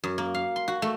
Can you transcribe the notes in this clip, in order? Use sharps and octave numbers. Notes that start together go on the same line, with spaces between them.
F#2
A#3
F5
C6
F#4
A3